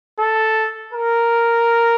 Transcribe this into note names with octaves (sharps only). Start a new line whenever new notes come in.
A4
A#4